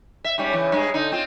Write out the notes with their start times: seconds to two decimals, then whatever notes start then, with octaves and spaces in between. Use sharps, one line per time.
0.24 E5
0.38 G#2 G3 C#4
0.53 C#3 E3
0.72 G2 G#3
0.94 D3 D#4
1.12 C4 F4